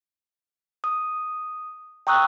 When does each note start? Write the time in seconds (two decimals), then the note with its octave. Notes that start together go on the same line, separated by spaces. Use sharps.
0.84 D#6
2.07 G5 A#5 C#6 D#6 E6 F#6